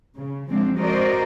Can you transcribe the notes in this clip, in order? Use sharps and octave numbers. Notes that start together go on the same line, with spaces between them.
C#3
F3 G#3 C4 D4
F#4 A#4 C5 D5 D#5